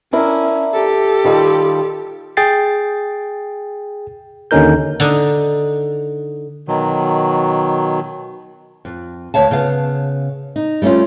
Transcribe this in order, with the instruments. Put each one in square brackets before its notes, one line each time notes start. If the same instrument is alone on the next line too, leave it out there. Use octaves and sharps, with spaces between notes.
[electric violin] C#4 [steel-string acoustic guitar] D4 E4 A#4
[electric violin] G4 A4
[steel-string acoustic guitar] D#3 G3 F4
[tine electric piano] G#4 G5 A6 C7
D#2 D3 C#4 D#4 A#4 G6
[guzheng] D3 D4 D#4
[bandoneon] B2 D#3 F#3
[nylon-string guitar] F2
D2 C#5 F5 A5
C#3 B3 F5
D#4
G3 A3 C4 C#4 F4